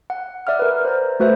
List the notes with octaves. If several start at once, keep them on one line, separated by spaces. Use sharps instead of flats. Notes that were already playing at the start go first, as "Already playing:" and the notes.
F#5
D5 E5 F#5 F6
A#4 B4
C5 A#5
A3 F#4 B4 C5 E5